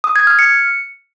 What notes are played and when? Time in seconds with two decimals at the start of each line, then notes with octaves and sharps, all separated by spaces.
0.04 D#6
0.16 G#6
0.27 F6
0.39 C#7